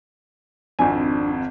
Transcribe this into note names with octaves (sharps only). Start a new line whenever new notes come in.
G#1 F2 D4 G#5